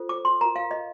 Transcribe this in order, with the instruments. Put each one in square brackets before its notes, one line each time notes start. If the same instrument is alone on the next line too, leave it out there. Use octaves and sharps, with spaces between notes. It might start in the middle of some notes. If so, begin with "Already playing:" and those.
Already playing: [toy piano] F4 A4 C5
D6
C6
F4 A#4 A#5
F5
D#5